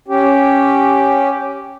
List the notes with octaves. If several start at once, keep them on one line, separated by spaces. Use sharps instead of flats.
C#4 G4